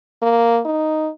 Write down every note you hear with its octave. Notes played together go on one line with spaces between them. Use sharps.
A#3
D#4